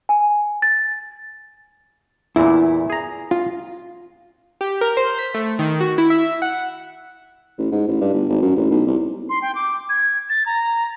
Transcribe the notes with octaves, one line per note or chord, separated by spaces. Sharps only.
G#5
A6
E2 A#2 E4
G#4 A#5
F4
G4
A#4
C5
B6
A3
D#3
F#4
E4
E5
F#5
A1
G#2
A1
G2
G1
G#1
F#2
A1
B1
C2
C6
G5
D6
G#6
A6
A#5